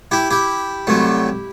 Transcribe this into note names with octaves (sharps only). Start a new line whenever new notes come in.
E4 G4
E4 G4
C2 C3 F#3 A3